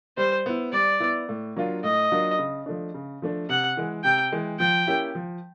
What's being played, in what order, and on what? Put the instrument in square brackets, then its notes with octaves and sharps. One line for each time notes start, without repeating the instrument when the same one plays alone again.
[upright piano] G3 [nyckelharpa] C5
[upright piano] B3 E4
[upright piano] G3 [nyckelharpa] D5
[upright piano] B3 E4
A2
F#3 A#3 D4 F4
[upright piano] A2 [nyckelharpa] D#5
[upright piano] F#3 A#3 D4 F4
C#3
F3 A3 D4
C#3
F3 A3 D4
[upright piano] C3 [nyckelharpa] F#5
[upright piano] E3 G#3
[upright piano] C3 [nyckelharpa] G5
[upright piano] E3 G#3
[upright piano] F3 [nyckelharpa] G5
[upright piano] A#3 C#4 E4 G4
F3